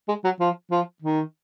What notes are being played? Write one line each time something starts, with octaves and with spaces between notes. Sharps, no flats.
G#3
F#3
F3
F3
D#3